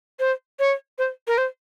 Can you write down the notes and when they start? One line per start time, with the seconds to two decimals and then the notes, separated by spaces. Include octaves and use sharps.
0.20 C5
0.59 C#5
0.98 C5
1.27 A#4
1.38 C5